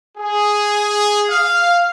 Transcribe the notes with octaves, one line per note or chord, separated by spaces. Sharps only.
G#4
F5